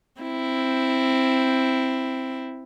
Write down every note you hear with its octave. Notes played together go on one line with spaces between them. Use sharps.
C4 E4